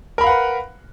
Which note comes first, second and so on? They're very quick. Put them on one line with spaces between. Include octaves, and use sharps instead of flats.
A#4 B5 F5 F#5 B4